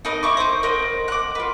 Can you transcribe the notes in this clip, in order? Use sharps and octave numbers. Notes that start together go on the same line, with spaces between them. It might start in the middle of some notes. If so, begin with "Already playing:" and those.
D#4 A#4 B4 D#5
E4 C#6 D6
D#4 C5
A#4 D#5 F#5
F#5 D6
F4 B4